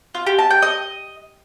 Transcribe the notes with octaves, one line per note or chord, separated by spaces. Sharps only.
F4
G4
A5
G5
D#5